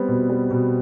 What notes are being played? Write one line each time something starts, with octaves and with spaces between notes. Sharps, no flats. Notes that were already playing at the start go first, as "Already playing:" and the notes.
Already playing: G3 B3 C4
B2
G3
B2